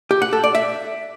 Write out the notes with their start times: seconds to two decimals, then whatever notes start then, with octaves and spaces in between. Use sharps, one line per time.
0.11 G4
0.22 F#5
0.33 A4
0.44 D5
0.55 E5